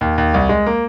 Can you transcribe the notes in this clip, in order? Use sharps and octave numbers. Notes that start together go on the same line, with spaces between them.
D#2
D#2
C2
G#3
A#3